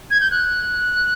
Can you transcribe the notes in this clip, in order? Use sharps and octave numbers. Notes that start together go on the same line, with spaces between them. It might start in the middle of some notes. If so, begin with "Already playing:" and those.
G#6
G6
F#6